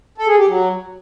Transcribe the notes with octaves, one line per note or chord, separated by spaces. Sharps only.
A4
G#4
G4
F#3